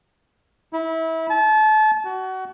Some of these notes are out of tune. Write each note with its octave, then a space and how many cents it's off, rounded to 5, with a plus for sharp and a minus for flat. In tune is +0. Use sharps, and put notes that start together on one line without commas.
E4 -25
A5 -30
F#4 +25